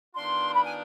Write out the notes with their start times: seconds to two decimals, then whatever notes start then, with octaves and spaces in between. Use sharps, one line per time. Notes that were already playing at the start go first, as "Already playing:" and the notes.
0.15 D#3 B3 D4 F4 C6
0.55 B5
0.64 G#5